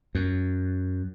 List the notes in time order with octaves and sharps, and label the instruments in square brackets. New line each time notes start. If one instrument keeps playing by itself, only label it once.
[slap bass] F#2